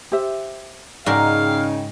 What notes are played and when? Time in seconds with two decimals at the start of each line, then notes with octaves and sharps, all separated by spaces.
0.12 G4 C5 E5
1.06 G#2 C#3 D#4 F#4 A#4 D5 F5 G5